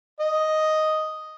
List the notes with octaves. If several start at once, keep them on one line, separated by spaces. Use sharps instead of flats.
D#5